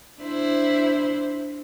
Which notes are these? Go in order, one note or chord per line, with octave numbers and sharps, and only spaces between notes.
D4 E4 C5